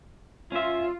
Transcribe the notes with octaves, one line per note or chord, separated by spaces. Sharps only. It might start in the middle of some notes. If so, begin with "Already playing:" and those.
C#4 F4 E5